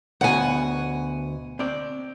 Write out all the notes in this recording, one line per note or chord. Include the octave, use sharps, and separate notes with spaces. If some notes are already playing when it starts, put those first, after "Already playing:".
D2 B2 F#5 G#5
C4 D5